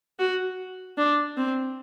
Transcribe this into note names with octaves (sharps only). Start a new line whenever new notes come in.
F#4
D4
C4